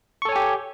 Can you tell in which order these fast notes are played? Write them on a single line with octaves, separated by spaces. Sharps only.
C#6 A4 C#5 G#5 G4